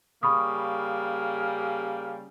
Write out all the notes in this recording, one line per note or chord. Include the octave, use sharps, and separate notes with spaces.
C#3 G3 A#3 B5 C#6 D#6